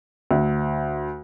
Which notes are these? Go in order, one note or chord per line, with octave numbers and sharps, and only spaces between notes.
D2